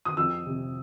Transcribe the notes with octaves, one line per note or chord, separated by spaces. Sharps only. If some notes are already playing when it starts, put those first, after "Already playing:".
D#6
F2 E6
C3